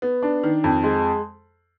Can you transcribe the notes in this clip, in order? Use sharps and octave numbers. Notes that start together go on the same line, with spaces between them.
B3
D4
D#3
F2
G#3